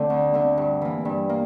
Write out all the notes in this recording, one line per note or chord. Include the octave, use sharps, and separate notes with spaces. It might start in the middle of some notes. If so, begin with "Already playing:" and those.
Already playing: D3 A3 C4
D2
D3 A3 C4
G2
E3 A#3
G2
A#3